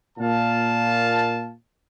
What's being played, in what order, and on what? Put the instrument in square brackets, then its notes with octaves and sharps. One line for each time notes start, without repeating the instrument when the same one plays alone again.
[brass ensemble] A#2 F5 A5